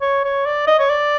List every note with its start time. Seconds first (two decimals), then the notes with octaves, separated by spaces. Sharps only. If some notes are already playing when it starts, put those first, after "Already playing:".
0.01 C#5
0.24 C#5
0.46 D5
0.67 D#5
0.79 C#5
0.90 D5